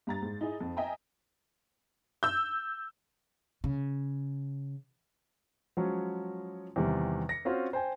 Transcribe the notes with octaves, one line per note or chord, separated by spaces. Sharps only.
G2 A#5 A6
G#2
D#4 E4 G#4 D#5
F2
D#5 E5 G5 G#5 A#5
E6 G6
C#3
F3 F#3 G#3 C#4
E2 C3 D#3 G3
A#6 C#7
C4 C#4 F4 F#4 C5
C5 G5 G#5